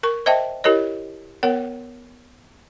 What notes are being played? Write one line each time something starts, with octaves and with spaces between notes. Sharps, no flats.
A#4 C#6
C5 D#5 E5 G5 A5
E4 G4 A#4 C#5 D#5
B3 A#4 C#5 F#5